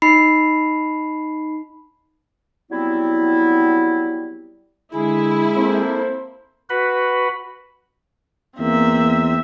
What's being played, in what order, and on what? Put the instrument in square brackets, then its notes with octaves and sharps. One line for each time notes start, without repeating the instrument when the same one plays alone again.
[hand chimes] D#4 B5 C7
[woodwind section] F#3 G3 B3 C4 E4
[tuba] D3 [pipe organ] G#3 G#4 [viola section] E4
[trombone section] A#3 A4 C5 [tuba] C4
[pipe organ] F#4 B4 B5
[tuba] E2 [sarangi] A#3 [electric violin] C4 E5